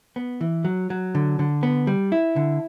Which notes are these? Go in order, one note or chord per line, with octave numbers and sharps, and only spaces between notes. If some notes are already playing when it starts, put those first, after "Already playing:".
B3
E3
F#3
F#3
D3
D3
B3
G3
E4
D3